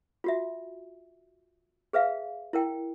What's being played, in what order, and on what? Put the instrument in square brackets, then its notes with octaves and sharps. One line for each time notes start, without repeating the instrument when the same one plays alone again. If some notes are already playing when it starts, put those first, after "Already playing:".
[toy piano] F4 F#4 E5
G#4 B4 E5 F5
E4 A#4 G5